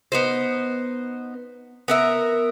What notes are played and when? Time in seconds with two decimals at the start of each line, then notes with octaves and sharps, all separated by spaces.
0.12 B3 D#4 C5
1.88 B3 A#4 E5